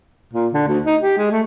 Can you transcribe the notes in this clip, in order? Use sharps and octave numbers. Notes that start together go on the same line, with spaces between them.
A#2
D3
D2
D#4
G4
G#3
A3